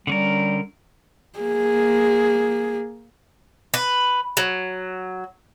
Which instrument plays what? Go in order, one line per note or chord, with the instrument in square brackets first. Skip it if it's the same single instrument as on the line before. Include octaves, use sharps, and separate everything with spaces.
[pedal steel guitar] D3 C#4 A#4 [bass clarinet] G3
[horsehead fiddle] A#3 G#4
[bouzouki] B4
F#3